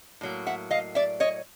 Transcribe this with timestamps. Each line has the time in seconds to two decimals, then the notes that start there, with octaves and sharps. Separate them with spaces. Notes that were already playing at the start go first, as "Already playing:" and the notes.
0.21 A2 F#3 A#3
0.47 E5 F#5
0.71 D#5 F5
0.95 D5 E5
1.20 C#5 D#5